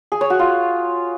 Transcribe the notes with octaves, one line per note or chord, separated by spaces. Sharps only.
G#4
C#5
F#4
F4